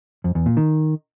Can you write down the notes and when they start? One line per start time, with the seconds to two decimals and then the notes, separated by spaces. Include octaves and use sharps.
0.24 F2
0.35 E2
0.46 A#2
0.57 D#3